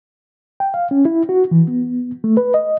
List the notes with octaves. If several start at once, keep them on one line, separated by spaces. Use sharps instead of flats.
G5
F5
C#4
E4
F#4
E3
B3
A3
B4
D#5